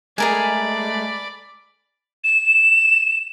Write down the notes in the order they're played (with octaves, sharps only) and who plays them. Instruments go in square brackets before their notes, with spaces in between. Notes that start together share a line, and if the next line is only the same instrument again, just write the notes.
[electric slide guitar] G#3 A3 [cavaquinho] G#4 A#4 G#5 [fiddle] D5 B5
[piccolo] E7